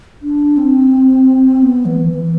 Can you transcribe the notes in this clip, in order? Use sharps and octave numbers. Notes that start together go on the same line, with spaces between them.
D4
C4
B3
E3
E3